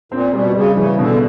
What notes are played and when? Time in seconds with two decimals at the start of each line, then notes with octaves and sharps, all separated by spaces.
0.12 A#2 C4
0.33 B2 G3
0.55 C#3 G3
0.76 C#3 E3
0.98 B2 D3